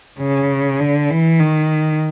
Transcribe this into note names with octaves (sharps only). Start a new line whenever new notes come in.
C#3
D3
E3
D#3